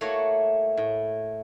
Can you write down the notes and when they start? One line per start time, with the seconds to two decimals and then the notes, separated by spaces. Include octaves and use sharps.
0.01 A3 A#3 E4 F#4 C#5
0.77 A2